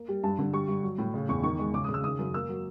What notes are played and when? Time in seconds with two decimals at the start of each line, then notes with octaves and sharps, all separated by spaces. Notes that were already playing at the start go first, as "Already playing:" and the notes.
Already playing: A#3
0.08 G3
0.23 G2 A5
0.39 D3
0.53 G3 C#6
0.68 G2
0.83 F#3
0.98 A2
1.14 C#3
1.29 E2 C#6
1.43 D#3 C#6
1.59 G#3
1.74 C#3 D6
1.84 D#6
1.89 C#3
1.94 E6
2.04 D#3 D#6
2.19 F#2
2.34 A#3 E6
2.49 F#3